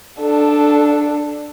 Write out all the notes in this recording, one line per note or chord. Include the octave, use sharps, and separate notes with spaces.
D4 A4